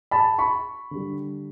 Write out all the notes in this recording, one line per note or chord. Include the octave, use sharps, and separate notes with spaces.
A5 B5
B5 C#6
D3 G3